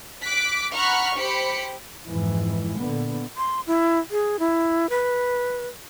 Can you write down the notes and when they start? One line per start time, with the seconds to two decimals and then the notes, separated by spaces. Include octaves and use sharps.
0.24 D6 F#6 B6 D7
0.73 F#5 A#5 B5 C#6 F6 F#6
1.16 G4 C5 B5 C#7
2.06 F2 G#2 E3
2.77 A#2 D3 B3
3.37 C6
3.67 E4
4.11 G#4
4.39 E4
4.90 B4